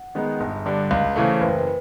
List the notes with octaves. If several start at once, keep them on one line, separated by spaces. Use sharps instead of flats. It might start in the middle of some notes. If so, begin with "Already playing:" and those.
Already playing: F#5
D#3 G#3 B3 D#4
G1
G2 D3
C#2 F5
F5
C#3 E3 A3
C5
F#1 B4
B4